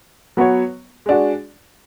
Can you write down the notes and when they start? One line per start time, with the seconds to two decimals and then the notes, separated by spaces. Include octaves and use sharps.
0.37 F#3 B3 F#4 C#5
1.06 G#3 D4 F#4